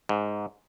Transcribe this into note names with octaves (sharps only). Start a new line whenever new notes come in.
G#2